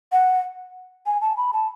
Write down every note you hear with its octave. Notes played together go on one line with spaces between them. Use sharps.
F#5
G#5
A5
B5
A5